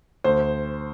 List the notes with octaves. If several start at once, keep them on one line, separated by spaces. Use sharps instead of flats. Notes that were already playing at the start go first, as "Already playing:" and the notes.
D2 C5